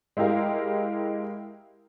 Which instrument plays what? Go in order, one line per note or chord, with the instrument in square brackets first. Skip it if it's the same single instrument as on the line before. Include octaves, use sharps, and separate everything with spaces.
[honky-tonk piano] G#3 E4 G4 A#4 F5